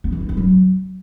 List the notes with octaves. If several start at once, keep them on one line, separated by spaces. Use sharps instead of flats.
B3
E3
D#4
B3
F#3